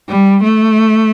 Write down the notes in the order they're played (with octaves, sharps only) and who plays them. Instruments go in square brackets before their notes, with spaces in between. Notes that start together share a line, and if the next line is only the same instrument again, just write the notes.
[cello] G3
A3